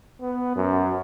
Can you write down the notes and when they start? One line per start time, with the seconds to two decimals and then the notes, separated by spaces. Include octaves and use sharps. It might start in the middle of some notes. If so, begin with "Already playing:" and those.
0.21 B3
0.56 F#2